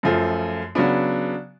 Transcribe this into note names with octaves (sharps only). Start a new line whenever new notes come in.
F#2 F3 A3
C#3 F#3 B3 D4